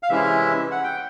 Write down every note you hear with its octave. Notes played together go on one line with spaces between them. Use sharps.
F5
C3 E3 G#3 C#4 E4 E5
F#5
G5